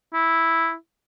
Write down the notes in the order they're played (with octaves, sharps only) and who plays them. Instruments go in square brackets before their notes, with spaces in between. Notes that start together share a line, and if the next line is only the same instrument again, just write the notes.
[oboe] E4